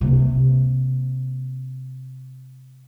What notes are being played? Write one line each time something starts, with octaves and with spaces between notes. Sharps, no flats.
C3 A#3